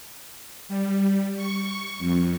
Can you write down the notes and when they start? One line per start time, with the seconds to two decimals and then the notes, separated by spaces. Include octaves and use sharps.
0.68 G3
1.36 C#6
1.98 F2